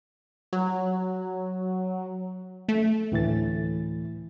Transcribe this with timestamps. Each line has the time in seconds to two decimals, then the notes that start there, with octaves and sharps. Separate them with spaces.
0.53 F#3
2.69 A3
3.12 D2 A2 E3 A6